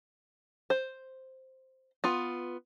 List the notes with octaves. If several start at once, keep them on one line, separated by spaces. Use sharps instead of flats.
C5
B3 F4